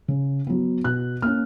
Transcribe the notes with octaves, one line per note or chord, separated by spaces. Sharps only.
C#3
F#3 B3
B2 F#6
A#3 C#4 F6